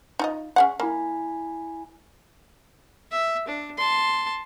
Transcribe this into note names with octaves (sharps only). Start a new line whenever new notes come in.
D#4 F4 D#5
C#4 G#4 F#5
A#3 E4 G#5 B5
E5
D4
A5 C6